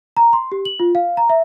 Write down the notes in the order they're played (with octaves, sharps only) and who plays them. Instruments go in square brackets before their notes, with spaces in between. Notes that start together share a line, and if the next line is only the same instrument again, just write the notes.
[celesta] A#5
C6
G4
F#7
F4
F5
A#5
E5